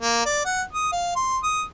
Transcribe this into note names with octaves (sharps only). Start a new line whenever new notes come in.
A#3
D5
F#5
D#6
F5
C6
D#6